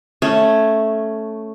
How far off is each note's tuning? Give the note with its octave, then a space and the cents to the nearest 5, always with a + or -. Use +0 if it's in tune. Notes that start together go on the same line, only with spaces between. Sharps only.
A3 +0 C#4 +0